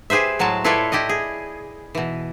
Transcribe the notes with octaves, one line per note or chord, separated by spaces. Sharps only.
G4 G#4 B4 C5 E5
A2 F#3 G#3 F#4 A5
E4 F4 A4 B4 C#5 D5
E4 G4 D5 D#5
G#4
B2 E3